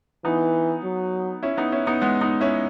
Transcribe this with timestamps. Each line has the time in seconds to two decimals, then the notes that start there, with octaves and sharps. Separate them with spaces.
0.24 E3 B3 D#4
0.84 F#3
1.43 C#4 E4
1.57 B3 D#4
1.72 C#4 E4
1.87 B3 D#4
2.02 G#3 B3
2.21 B3 D#4
2.41 C#4 E4